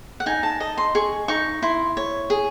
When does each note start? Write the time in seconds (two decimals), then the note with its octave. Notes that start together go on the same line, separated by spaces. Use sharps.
0.20 F#5
0.26 D#4 G#5
0.43 A5
0.60 D#5 A5
0.78 C6
0.95 G#4 C#6
1.28 D#4 C#6
1.62 E4 C6
1.97 C#5
2.30 G#4